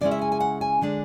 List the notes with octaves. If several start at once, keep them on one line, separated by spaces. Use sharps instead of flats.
C#3 G#3 C#4 E4 D5
E5
G#5
G#5
F#5
G#5
D3 G#3 D4